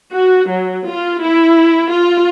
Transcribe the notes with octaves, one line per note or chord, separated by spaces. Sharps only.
F#4
F#3
F4
E4
F4